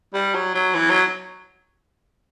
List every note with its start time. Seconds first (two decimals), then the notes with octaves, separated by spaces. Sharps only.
0.14 G3
0.34 F#3
0.54 F#3
0.74 E3
0.89 F#3